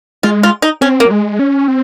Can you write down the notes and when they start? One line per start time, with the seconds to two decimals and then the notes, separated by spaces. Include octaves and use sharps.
0.23 G#3 F4
0.43 F4
0.62 D#4
0.81 C4 C#4
1.00 A#3
1.06 F#3
1.11 G#3
1.39 C#4
1.68 C4